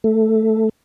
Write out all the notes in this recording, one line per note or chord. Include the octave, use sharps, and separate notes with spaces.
A3